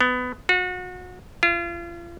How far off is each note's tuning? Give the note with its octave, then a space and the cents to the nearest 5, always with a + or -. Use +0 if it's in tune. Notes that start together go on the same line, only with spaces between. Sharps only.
B3 +20
F#4 -30
F4 -35